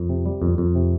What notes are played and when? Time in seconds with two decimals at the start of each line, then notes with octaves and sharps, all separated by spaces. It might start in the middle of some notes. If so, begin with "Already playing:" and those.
Already playing: F2
0.09 C3
0.26 G3
0.42 F2
0.58 F2
0.75 C3